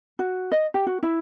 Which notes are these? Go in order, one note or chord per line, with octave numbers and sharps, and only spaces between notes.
F#4
D#5
G4
F#4
E4